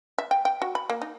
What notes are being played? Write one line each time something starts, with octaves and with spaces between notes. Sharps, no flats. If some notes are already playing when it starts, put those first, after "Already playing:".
E5
G5
G5
F#4
B5
A#3
D#4